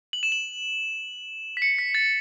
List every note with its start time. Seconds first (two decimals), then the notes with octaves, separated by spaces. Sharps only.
0.13 F#7
0.23 E7
0.32 F#7
1.57 B6
1.62 C#7
1.79 B6
1.95 A6